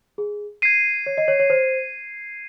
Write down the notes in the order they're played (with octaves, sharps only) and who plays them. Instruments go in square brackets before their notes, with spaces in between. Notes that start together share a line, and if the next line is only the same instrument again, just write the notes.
[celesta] G#4
[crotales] G#6 C7 D#7
[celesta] C#5
D#5
C#5
C#5
C5